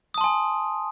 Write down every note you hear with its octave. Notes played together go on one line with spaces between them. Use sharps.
G#5 A5 C6 D#6